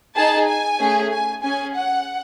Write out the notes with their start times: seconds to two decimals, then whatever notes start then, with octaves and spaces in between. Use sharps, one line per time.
0.16 D#4 G#4 A5
0.48 G#5
0.79 A3 C#4 G#4
1.11 G#5
1.43 C#4 G#4 G#5
1.75 F#5